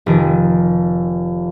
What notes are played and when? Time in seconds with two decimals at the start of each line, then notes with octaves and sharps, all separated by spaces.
0.06 F1 D#3 D7